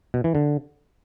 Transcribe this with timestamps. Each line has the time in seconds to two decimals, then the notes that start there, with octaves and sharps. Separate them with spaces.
0.14 B2
0.24 E3
0.35 D3